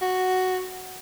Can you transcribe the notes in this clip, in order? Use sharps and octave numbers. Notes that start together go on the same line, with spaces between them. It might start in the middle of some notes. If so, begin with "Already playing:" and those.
F#4